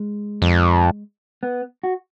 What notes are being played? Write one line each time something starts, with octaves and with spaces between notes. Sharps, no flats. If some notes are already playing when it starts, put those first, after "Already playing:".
Already playing: G#3
F2
B3
F#4